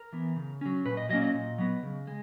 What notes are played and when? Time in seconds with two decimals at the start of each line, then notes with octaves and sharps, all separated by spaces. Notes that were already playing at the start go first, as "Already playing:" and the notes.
Already playing: A#4
0.13 E3 B3
0.36 C#3
0.61 F#3 C#4
0.85 A#2 B4
0.97 D#5
1.09 F#3 A#3 C#4 D#5
1.22 D#5
1.34 A#2
1.58 F#3 B3
1.83 C#3
2.07 G#3